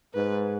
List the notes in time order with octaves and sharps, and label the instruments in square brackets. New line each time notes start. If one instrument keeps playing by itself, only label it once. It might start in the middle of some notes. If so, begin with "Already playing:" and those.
[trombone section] G#2 [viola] B4